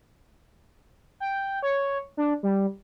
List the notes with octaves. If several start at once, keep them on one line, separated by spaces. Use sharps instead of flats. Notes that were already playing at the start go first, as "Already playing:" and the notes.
G5
C#5
D4
G3